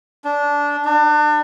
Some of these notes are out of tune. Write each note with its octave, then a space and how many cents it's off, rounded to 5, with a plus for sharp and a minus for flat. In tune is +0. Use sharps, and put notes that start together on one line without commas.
D4 -15
D4 +35